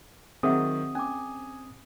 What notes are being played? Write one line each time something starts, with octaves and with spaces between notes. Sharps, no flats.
D#3 F#3 C4 G#4 E5 F#5 D#6
C#4 G#5 D6